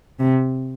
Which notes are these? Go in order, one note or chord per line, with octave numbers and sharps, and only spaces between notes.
C3